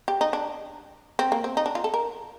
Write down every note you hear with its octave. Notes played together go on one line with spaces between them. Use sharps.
G4
D#4
D4
C4
A#3
C4
D#4
D4
F4
A4
A#4